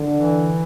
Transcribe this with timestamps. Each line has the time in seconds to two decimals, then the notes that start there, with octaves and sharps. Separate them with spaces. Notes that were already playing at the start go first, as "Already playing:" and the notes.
Already playing: D3
0.16 E3